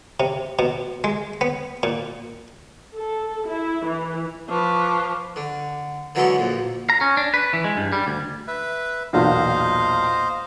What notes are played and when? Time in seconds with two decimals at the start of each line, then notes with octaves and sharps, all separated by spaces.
0.20 C3
0.59 B2
1.04 G#3
1.41 B3
1.83 A#2
2.97 A4
3.48 E4
3.85 E3
4.49 F3 B4 C#6 D6
5.36 D3
6.15 D3 E3 F#3 G#3 C#4 A4
6.38 A#1 F2
6.90 A#5
7.01 C#4
7.17 D4
7.34 B4
7.53 E3
7.64 G#3
7.77 G2
7.92 G3
8.07 D2
8.47 B4 E5
9.13 B1 E2 A#2 C5 D#5 F5